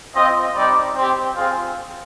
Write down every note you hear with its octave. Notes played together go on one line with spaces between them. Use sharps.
C4 F4 D#5
G3 C4 D#4 G4 D5
C4 G4 C5
C4 F4 G#4